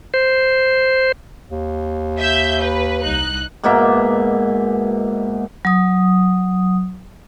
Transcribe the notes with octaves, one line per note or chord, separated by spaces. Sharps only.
C5
D#2
E5 G6
B4
C2 D#4 F#6
G#2 B2 A#3 E5
F#3 D#6